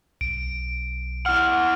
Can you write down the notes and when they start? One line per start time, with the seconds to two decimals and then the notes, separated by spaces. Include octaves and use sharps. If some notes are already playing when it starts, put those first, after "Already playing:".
0.21 B1 D7
1.26 E4 F#5 F6